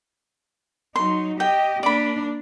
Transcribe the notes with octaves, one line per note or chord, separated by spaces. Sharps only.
F#3 D#4 C6
G4 D#5 G5
A#3 D4 D5 B5